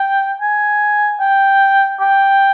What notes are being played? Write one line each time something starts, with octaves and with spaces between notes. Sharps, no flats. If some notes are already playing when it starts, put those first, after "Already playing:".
Already playing: G5
G#5
G5
G5